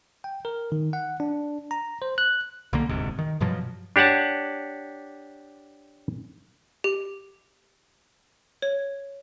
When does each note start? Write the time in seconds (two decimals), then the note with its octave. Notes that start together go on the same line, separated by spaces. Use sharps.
0.24 G5
0.45 A#4
0.72 D#3
0.93 F#5
1.20 D4
1.71 A#5
2.02 C5
2.18 F#6
2.73 B1 D3 A#3
2.89 E1 D2 G#2 C3
3.19 D#3
3.40 G2 B2 F3 F#3
3.96 D4 G4 C#5 F#5 A5
6.84 G4
8.62 C#5